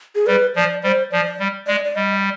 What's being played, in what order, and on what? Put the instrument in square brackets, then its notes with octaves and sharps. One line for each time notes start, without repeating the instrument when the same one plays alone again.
[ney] G#4
[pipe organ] G3 [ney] B4
[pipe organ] F3 [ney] D5
[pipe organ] G3 [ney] C5
[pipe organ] F3 [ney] D5
[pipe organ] G3
[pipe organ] G#3 [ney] D5
[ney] D5
[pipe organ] G3 [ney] D#5